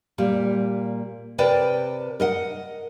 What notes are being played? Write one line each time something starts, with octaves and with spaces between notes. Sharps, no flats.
A#2 G3
C3 A#4 B4 D5 G5 A5
A#4 D#5 F#5